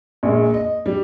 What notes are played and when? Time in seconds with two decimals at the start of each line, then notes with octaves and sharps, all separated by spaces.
0.23 A#1 A#2 G#3
0.54 D#5
0.86 G3